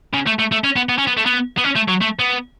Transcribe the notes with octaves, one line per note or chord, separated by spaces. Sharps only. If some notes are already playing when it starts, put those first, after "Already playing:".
C#3
A3
A3
A3
C#4
B3
B3
C#4
B3
A3
B3
B3
C#4
A3
F#3
A3
B3